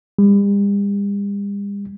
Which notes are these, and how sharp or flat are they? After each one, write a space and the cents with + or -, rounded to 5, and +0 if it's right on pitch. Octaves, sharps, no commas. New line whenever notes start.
G3 +45